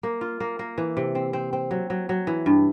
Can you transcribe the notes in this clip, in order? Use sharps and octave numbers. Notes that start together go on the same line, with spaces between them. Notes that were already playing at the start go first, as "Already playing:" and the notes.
A#3
F4
A#3
A#3
E3
C3
C4
C4
C4
F#3
F#3
F#3
E3
G2